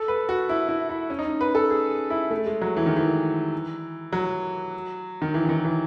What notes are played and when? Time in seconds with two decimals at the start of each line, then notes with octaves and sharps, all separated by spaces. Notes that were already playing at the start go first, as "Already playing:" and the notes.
Already playing: A4
0.08 B4
0.29 F#4
0.49 E4
0.69 E4
0.89 E4
1.10 C#4
1.19 D#4
1.24 C#4
1.41 B4
1.55 A4
1.70 G#4
2.10 E4
2.31 A3
2.46 G#3
2.62 F#3
2.77 E3
2.86 D#3
2.96 E3
4.13 F#3
5.22 D#3
5.34 E3
5.45 E3
5.49 D#3
5.64 E3